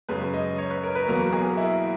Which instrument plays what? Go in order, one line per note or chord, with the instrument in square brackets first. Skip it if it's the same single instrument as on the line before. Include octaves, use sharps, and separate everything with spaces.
[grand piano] F#2 C#3 G#3 B4
D#5
C#5
B4
A#4
B4
E2 B2 F#3 A#3 A#4
G#4
E4